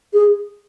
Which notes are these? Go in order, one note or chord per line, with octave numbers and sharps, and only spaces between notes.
G#4